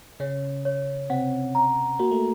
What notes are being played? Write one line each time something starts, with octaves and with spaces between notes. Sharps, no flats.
C#3 C#4 C#5
C#5
C3 C4 F#5
A#5
A#3 F#4
A3